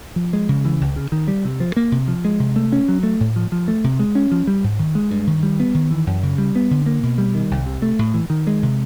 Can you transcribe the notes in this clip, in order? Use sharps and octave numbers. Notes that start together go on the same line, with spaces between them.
F3
G#3
C#3
E3
C#2
C#3
D#3
G3
C3
F3
A#3
C3
F3
G#3
C3
A3
C#4
F#3
A3
A2
F3
F3
A3
C3
G#3
C#4
F3
G3
G#2
D#3
G#3
G2
D#3
G3
B3
D#3
E3
F#2
C#3
G3
B3
D3
A#3
B2
G3
D#3
C2
C3
A3
A2
E3
D#3
G#3
C3